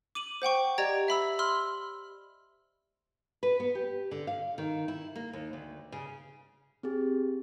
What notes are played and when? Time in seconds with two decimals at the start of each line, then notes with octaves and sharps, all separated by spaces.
0.15 D6 D#7 F#7
0.42 C5 F#5 G5 C#6
0.78 G4 D5 D#5 A#5 G#6 D7
1.08 E5 B5 E6
1.39 B5 C6 E6 F6
3.43 B4
3.60 B3
3.75 G4
4.11 D3
4.27 F5
4.58 D#3
4.88 E4
5.16 A#3
5.33 D#2
5.53 D2
5.92 C#3
6.83 C4 G4 G#4